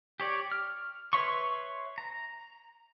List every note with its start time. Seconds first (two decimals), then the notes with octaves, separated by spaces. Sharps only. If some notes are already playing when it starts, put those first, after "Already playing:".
0.20 G4 C#5 D5
0.52 F6
1.13 B4 C#5 E5 C6 C#6
1.98 A#5